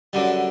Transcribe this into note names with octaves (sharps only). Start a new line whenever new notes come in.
F#2 D3 G3